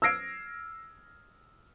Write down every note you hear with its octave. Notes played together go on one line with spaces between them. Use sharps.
E6 F6 G#6 A#6 C7 D7